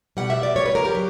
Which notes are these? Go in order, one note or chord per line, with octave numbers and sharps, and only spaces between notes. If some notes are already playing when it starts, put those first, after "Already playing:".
B2 G3 F#5
E5
D5
C#5
B4
A#4
G4
F#3